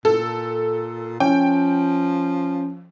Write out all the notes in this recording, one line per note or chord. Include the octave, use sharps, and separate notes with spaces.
A#2 A4
F3 C#4 G5